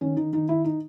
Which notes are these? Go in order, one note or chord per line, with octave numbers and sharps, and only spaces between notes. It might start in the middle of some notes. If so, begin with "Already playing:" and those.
D#3 C#4
D#3 D#4
D#3 D#4
D#3 E4
D#4